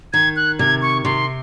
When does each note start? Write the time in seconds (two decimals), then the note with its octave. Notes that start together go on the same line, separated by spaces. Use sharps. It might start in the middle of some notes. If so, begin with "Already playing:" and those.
0.13 D#3 G#6
0.36 F#6
0.59 C3 G#6
0.82 C#6
1.05 C3 C6